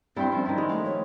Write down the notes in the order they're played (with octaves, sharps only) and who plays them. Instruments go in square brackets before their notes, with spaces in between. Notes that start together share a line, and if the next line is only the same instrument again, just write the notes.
[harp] G2 G5 C6 [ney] C4 [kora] E4
[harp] F3 [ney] C#4
[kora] D#3 E4
G#3
[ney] A3 [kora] F5
[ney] C#5